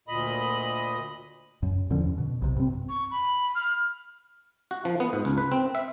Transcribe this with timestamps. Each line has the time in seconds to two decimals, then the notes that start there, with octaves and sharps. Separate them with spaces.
0.08 D2 A#2 D#5 B5
1.62 F#2
1.90 E2 D3 F3 C#4
2.18 B2
2.42 B1 C3
2.56 G2 C4
2.89 C#6
3.11 B5
3.55 F6
4.71 F#4
4.85 F3
5.00 B3
5.13 G#2
5.25 C#2
5.38 B4
5.52 C4
5.75 E5